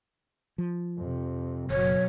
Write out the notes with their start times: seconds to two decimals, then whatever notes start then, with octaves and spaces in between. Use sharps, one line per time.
0.58 F3
0.98 F2 C3
1.70 F#1 B2 F#3 C#5